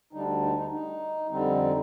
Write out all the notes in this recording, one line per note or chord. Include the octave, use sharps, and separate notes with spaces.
D2 D3 G3 D4 D#4
D#4
D#4
D#4
F2 D3 G3 C4 D#4